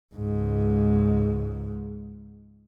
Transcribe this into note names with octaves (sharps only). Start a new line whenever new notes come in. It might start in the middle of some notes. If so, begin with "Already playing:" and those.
C#2 G#2